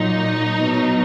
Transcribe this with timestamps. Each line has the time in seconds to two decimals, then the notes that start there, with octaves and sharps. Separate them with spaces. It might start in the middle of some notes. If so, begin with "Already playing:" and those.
Already playing: A#2 F#3 D#4
0.59 B2 F#3